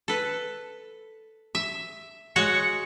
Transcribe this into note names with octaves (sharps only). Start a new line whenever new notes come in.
A4 B4
E5
G#3 F#4 C#5 C#7